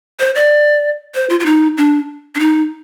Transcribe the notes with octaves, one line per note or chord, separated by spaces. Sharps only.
C5
D5
C5
F4
F4
D#4
D4
D4
D#4